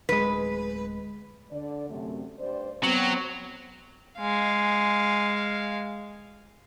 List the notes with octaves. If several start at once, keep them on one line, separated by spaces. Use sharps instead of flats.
D1 G#3 B4
D3 D5
F#2 C3 A3
G2 C5 D5
F#3 B3 C4
G#3 F5